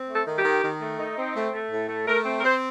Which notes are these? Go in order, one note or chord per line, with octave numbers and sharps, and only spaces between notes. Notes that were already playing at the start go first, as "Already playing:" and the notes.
Already playing: C4
A3
A4
D#3
G4
D#3
D#3
A3
D#4
C4
A3
A3
A2
A3
A3 A#4
C4
A#4
C4 C5